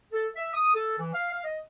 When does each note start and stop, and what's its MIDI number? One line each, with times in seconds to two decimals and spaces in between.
0.12 0.27 69
0.36 0.51 76
0.53 0.70 87
0.74 0.94 69
0.99 1.12 52
1.13 1.29 77
1.31 1.44 77
1.44 1.59 75